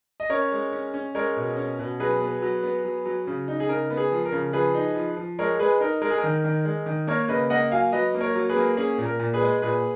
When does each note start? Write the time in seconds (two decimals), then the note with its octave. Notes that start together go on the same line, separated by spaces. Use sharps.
0.20 D#5
0.30 C#4 A#4 C#5
0.52 G#3
0.72 C#4
0.94 C#4
1.15 G#3 A#4 C#5
1.36 B2
1.57 C#4
1.79 B2
2.00 F#3 G#4 B4
2.21 B3
2.42 F#3
2.63 B3
2.85 F#3
3.06 F#3
3.27 C#3
3.48 D#4
3.60 G#4
3.69 C#3 A#4
3.90 B3
3.97 G#4
4.12 F3
4.25 A#4
4.32 C#3
4.53 F3 G#4 B4
4.75 D#4
4.96 F3
5.17 F3
5.39 G#3 A#4 C#5
5.59 G#3 G#4 B4
5.80 D#4 A#4
6.02 G#3 A#4
6.10 G#4
6.18 A#4
6.24 D#3
6.44 D#3
6.65 G#3
6.86 D#3
7.07 A#3 A#4 C#5
7.28 C#3 B4 D#5
7.50 A#3 D#5 F#5
7.72 F#3 F5 G#5
7.92 F#3 B4 D#5
8.14 A#3
8.21 A#4 C#5
8.35 F#3
8.49 G#4 B4
8.56 A#3
8.77 C#4 G#4
8.98 A#2
9.05 A#4
9.19 A#2
9.33 G#4 B4
9.41 G#3
9.62 A#2 G#4 B4